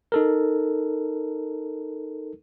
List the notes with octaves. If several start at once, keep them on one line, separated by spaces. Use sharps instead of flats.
D#4 A4 A#4